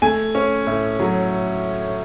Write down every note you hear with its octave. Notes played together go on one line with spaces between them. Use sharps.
A3 G#5
C#4
A2
F#3